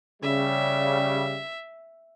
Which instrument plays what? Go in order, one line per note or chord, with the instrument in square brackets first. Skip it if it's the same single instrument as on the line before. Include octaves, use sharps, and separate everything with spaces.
[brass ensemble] C#3 G3 [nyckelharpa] E5